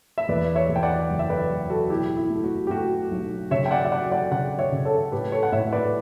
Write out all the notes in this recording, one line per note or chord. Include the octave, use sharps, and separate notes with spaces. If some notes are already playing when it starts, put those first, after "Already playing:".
E5
E2 B4 D5
C#5 E5
E2
G5
D5 F#5
F#1
E5
B4 D5
F#1
F#4 A4
B2 E4 G4
E4
A3
F#4
G4
A3 F#4
B1
C#3 C#5 E5
G5
D5 F#5
E5
F#3 D5 F#5
D5 F#5
C#3 D5 F#5
C#5 E5
C#3
A4 C#5
A2 G4 B4
A4 C#5
F#5
A2 C#5 E5
B4 D5